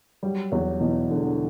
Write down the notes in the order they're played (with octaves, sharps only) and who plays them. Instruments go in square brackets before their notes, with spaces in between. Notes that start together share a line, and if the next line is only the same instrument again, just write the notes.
[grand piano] F#3 [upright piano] G3
[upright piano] E2 [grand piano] F#3
[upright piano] B2 [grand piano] E3
[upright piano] E1 [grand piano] D3